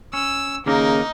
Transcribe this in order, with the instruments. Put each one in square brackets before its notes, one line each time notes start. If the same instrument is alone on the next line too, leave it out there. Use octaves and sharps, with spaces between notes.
[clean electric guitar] C#4 [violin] E6
[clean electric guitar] D#2 A#3 A#4 [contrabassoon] C#3 [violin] D#4